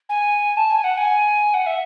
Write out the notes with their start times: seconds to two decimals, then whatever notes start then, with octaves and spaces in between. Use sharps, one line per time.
0.09 G#5
0.56 A5
0.70 G#5
0.83 F#5
0.97 G#5
1.53 F#5
1.66 E5